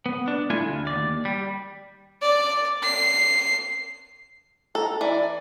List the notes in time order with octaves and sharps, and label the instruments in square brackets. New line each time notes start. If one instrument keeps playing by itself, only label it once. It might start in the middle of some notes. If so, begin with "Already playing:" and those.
[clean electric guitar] B3
D4
A3 E4 F4 A4 G#5
D2
D#2 D5
G3
[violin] D5
C7
[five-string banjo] A4 [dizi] A#5
[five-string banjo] E3 [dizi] D5